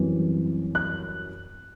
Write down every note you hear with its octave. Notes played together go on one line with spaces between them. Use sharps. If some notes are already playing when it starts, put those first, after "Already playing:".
Already playing: F#2 E3 G3 C4
F#6